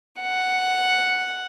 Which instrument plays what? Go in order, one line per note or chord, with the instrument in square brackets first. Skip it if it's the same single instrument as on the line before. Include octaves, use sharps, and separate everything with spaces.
[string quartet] F#5